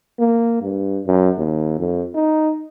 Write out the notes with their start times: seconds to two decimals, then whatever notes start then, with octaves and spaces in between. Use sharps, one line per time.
0.19 A#3
0.62 G2
1.06 F#2
1.38 D#2
1.79 F2
2.15 D#4